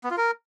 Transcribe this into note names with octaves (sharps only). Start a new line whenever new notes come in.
B3
F4
A#4